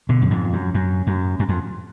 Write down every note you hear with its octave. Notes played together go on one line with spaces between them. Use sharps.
B2 D3
F#2
F2 G#2
F#2
F#2
F#2
F#2
F2